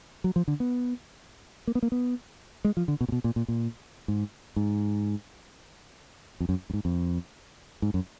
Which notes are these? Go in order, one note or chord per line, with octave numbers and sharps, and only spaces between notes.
F#3
F3
D3
B3
A#3
B3
A#3
B3
G#3
F3
D3
B2
A#2
B2
A#2
A#2
A#2
G#2
G#2
F2
F#2
F#2
G#2
F2
G#2
F#2